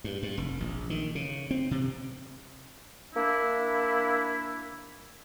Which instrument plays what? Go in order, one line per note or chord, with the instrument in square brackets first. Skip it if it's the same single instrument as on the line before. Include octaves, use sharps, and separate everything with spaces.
[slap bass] G2
G2
F1
A#1
D#3
C#3
C4
C3
[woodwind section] A#3 D4 E4